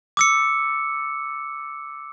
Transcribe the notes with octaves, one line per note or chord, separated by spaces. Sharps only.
D6 E6 C#7